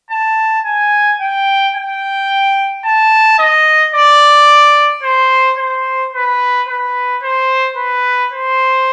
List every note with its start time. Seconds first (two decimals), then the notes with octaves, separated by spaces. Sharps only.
0.10 A5
0.65 G#5
1.21 G5
1.75 G5
2.85 A5
3.39 D#5
3.95 D5
5.03 C5
5.58 C5
6.13 B4
6.68 B4
7.23 C5
7.77 B4
8.32 C5